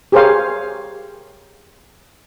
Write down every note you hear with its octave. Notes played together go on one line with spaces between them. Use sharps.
G4 G#4 A#4 C5 C#5 F5